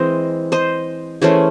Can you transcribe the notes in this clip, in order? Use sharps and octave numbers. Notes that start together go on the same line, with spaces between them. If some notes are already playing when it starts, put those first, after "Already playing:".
Already playing: E3 G#3 C4 C5 D#5
C5 D#5
E3 A3 C#4 G#4 C5